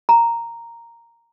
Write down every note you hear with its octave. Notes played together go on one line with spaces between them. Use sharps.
A#5